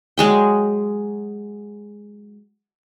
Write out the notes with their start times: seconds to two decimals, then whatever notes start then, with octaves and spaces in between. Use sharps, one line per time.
0.18 F#3 G#3 G#4 G5